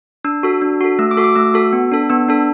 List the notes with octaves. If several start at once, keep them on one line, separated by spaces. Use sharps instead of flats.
D4 E6
F#4 A4
D4
F#4 A4
A3 E6
D6
F#4 A4
D6
A3 E6
F#4 A4
B3
D4 A4
B3 E6
D4 A4